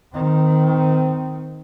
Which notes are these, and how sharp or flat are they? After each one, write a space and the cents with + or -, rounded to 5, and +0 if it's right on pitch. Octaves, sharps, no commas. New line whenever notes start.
D#3 +0 C4 -25